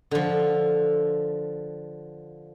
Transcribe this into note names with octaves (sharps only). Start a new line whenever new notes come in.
D3 F3